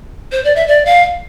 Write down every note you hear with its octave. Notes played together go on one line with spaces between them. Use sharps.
C5
D5
E5
D5
F5